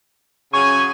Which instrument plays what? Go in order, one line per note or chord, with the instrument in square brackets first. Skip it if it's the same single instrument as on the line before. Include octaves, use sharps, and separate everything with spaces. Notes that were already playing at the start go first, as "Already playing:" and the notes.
[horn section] C#3 F#3 G#5 [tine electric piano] C#6